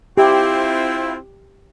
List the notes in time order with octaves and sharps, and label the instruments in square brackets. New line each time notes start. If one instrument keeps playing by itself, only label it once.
[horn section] C4 E4 F4 [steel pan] G4